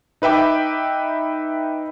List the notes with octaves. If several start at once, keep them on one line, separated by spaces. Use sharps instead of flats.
D#4 B4 E5 G5 D6